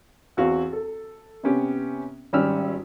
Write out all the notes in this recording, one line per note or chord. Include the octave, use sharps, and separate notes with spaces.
E2 C4 F#4 F5
A4
C3 B3 C#4 G4
G#1 G3 C#4 E6 F6